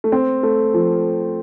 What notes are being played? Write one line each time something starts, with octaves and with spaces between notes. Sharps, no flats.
A3
C4
A3
F3